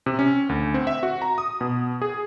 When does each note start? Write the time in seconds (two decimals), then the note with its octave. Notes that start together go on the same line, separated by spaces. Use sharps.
0.06 C3
0.19 C#4
0.49 D2
0.74 C4
0.87 E5
1.03 F#4
1.22 A#5
1.38 D#6
1.61 B2
2.02 G#4